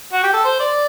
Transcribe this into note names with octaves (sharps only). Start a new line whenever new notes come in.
F#4
G4
A4
C5
D5